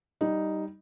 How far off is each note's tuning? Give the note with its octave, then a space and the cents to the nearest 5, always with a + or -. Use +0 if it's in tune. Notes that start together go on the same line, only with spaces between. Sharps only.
G3 -10 D#4 +0